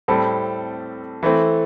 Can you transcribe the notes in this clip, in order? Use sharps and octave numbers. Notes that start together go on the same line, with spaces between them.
A2 G3 C4 A4
E3 A3 C4